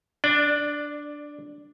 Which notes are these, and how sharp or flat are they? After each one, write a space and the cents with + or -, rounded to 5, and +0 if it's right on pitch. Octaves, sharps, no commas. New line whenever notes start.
D4 +0 D5 +20